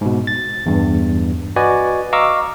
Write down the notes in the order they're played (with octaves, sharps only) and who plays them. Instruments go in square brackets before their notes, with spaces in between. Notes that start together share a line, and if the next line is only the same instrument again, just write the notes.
[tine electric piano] G#2 B2
A6
E2 G2
F#4 B4 D5 D#5 G#5
D#5 F5 A#5 C#6 D6 E6